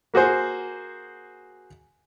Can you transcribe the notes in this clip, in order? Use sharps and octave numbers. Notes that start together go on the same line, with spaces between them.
A#3 F#4 G#4 C5